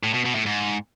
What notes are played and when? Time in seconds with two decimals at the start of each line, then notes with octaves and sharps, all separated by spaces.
0.03 A2
0.14 B2
0.25 B2
0.35 A2
0.46 G#2